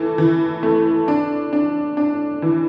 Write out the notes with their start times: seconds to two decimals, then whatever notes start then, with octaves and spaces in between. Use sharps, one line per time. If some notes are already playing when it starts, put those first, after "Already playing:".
Already playing: E3 A3
0.18 E3
0.63 A3
1.08 D4
1.53 D4
1.97 D4
2.42 E3